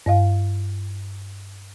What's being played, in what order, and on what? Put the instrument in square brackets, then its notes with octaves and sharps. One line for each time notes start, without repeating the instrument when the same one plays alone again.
[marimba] G2 D#5 F5